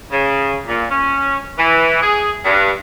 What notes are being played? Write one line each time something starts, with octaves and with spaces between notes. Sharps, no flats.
C#3
A#2
C#4
E3
G#4
G2